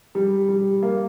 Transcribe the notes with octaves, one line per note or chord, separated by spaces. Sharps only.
G3
G3
A#3